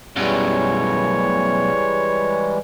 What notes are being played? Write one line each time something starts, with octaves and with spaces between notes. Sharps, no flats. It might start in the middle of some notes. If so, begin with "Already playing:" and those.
F#2 B2 E3 G3 G#3 C#5